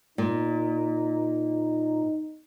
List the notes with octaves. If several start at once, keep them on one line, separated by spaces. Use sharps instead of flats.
A#2 D#4